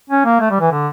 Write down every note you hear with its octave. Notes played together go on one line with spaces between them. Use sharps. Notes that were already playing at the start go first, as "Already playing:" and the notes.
C#4
A#3
A3
G3
E3
D3